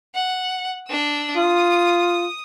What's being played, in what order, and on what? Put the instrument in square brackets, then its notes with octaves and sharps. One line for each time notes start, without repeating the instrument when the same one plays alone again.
[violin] F#5
D4 E6
[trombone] F4 [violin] D#6